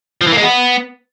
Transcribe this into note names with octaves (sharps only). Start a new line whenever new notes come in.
F3
E3
A#3
G#3
B3